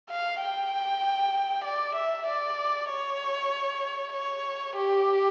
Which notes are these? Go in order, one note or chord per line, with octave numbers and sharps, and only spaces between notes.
F5
G5
D5
E5
D5
C#5
C#5
G4